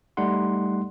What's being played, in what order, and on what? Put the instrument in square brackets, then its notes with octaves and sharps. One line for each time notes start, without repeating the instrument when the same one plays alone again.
[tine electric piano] G3 A3 D#4 F#5 C6